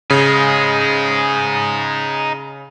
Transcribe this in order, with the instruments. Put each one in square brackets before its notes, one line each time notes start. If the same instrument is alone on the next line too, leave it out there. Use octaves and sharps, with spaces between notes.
[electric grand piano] C#3 [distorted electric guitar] D#4 G#4